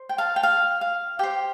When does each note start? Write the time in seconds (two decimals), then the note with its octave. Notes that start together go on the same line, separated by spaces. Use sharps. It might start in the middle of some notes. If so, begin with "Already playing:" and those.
Already playing: C5
0.09 G5
0.18 F5 A5
0.36 G5
0.43 F5
0.81 F5
1.19 G4 C5 G5